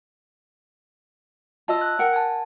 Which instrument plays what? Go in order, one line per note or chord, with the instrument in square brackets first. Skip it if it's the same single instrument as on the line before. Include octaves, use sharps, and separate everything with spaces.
[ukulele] F4 D#5 [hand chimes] A5 E6
[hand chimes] F#6
[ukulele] A#4 F#5 G5
[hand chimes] G#5 A5